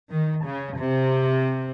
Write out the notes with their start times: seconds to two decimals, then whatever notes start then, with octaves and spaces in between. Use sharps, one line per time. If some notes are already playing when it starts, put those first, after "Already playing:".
0.11 D#3
0.46 C#3
0.78 C3